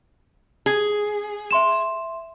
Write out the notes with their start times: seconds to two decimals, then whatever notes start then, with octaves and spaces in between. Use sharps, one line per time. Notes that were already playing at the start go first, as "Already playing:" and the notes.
0.66 G#4
1.51 E5 C6 E7